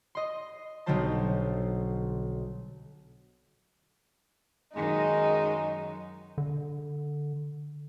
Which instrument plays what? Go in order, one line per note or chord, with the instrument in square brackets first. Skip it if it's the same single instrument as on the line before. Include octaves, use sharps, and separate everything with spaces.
[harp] D#5 C6
B1 D3 F#3 G3 C5 A5
[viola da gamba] F#2 D#3 [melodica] G#3 [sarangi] D#4
[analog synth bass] D3